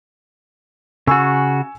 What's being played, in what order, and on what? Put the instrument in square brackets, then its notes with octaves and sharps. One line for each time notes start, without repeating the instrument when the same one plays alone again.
[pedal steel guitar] C#3 F#4 [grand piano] G#5 C#6 E6